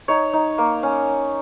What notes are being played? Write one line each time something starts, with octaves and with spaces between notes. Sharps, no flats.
D#4 C#5
D#4
A#3
C#4